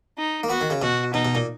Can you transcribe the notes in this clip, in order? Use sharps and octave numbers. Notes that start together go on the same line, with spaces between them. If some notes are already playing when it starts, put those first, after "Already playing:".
D#4
A#3
B3 F#4
D#3
C#3
B2 F#4
B2 D#4
B2
A#2